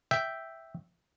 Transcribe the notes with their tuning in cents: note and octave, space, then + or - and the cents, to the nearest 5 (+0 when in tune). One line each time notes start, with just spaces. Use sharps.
E5 +0 G5 -5